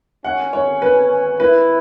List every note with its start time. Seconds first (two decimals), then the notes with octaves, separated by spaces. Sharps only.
0.24 C#4 F#5
0.53 C#5
0.82 B4
1.40 E4 B4